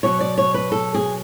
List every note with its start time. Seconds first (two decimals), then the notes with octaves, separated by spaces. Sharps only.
0.03 B2 F#3 C#5
0.21 D5
0.38 C#5
0.54 B4
0.72 A4
0.94 G#4